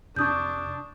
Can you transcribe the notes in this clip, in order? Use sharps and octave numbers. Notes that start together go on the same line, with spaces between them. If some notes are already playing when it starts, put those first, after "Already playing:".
F2 C3 D4 C#6 D#6 G6